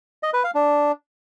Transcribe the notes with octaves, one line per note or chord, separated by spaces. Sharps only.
D#5
B4
F5
D4